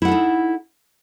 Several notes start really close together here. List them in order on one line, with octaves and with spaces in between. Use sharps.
E4 F#5 A4 D#4